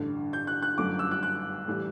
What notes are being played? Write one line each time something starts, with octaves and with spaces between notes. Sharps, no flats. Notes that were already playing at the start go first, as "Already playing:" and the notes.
Already playing: A1 G2 D3
G6
F#6
F#6
G1 F#2 F#3 A3 D6
E6
F#6
F#6
A2 E3 G3